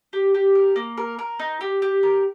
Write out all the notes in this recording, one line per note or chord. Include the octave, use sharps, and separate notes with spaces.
G4
G4
A#4
A#3
A#4
A#4
D#4
G4
G4
A#4